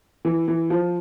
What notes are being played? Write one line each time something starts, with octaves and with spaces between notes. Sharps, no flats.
E3
E3
F3